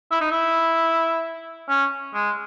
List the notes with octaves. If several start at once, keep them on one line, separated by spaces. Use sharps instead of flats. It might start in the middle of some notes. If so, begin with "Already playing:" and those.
E4
D#4
E4
C#4
G#3